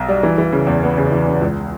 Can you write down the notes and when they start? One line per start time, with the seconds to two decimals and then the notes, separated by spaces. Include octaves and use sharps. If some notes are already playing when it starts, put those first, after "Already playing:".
Already playing: B1
0.08 G3
0.23 E3
0.38 E3
0.52 C#3
0.67 E2
0.83 B3
0.97 C#3
1.12 E3
1.27 C#3
1.41 C#2